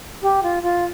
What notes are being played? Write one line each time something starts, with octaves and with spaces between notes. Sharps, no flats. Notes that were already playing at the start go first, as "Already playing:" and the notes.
G4
F4
F4